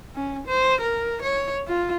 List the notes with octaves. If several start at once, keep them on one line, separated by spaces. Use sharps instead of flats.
C#4
C5
A#4
C#5
F4